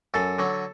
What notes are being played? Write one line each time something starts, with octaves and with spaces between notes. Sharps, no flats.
F#2 A4
D3 F#3